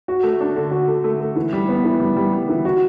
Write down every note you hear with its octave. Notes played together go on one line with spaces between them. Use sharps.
F#4
A3
D4
D3
F#4
D3
A3
A3
E3
G3
B3
E3
G3
G3
G3
E3
F#4